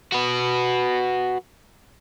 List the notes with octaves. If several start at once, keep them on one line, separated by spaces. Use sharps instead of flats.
F#4 B4